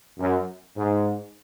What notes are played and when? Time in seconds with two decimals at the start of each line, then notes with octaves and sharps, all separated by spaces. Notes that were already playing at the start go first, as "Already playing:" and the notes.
0.19 F#2
0.77 G#2